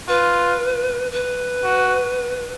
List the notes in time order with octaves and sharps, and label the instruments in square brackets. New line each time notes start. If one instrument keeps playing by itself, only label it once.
[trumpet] F4 [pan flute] B4
[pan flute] B4
[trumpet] F#4